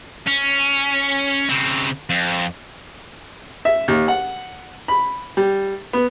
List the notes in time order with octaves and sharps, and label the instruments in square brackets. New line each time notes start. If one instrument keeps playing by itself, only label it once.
[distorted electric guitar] C#4
C#3 C4
F2
[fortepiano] E5
D#2
F#5
B5
G3
B3